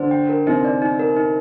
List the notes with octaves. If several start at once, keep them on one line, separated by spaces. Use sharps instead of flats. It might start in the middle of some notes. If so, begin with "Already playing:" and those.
Already playing: D3 D4 C5
G5
A#4
C3 C4 D#4
D5
D#4
A#4
D#4